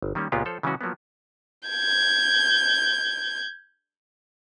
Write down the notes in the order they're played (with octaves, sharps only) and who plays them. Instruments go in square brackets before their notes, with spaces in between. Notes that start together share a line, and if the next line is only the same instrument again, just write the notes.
[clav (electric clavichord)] G1
D#3 G3 A#3 C#4
C#2 A#2 G#3 B3 F4 G4
F3 A4 C5 C#5
C#3 E3 F#3 G#3 C#4 F#4
F3 F#3 A#3 B3
[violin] G6 G#6